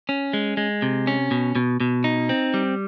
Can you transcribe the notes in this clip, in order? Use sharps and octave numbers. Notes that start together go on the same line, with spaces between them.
C#4
G#3
G#3
C3
C#4
B2
B2
B2
D#4
C4
G3